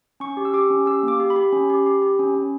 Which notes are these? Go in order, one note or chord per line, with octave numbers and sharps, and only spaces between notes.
C#4 C#6
G4
E6
G4 D6
C#4
G4 E6
A#3
D6
G4
B5
G4
C#4
G4
G4
G4
C#4
C#4